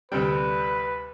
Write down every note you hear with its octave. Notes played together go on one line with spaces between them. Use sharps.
D2 C3 G3 B4 G5